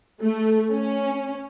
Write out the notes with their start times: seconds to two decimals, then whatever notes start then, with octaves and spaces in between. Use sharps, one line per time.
0.22 A3
0.73 C#4